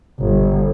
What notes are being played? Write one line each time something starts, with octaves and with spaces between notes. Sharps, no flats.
G1